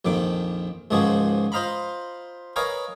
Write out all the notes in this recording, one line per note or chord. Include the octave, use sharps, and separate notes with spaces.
A#1 F2 D#3 D6
C#2 G#2 D#3 F3 F#4 G#4
F4 C5 D#5 F5 A#5 B5
A#4 B4 C#5 D#5 F5 G#5